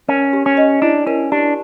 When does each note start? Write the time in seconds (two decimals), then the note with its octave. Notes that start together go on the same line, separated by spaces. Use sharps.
0.08 C#4 A#4
0.33 G4
0.46 C#4
0.57 D#5
0.82 D4 E4
1.07 C#4 A#4
1.32 D4 G4